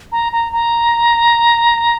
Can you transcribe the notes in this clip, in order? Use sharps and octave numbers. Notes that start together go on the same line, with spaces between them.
A#5
A#5
A#5